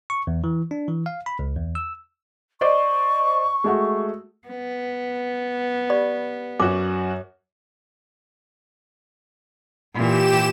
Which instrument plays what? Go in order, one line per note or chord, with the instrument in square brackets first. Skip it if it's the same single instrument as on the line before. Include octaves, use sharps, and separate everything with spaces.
[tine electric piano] C#6
E2
E3
D4
E3
F5
B5
C#2
E2
E6
[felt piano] C5 D5 D#5 [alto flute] C#6
[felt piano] G#3 A3 F#4
[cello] B3
[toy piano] G4 D5 B5
[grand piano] F#2 F#4 [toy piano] D6
[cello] A#2 E3 [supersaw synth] G4 E7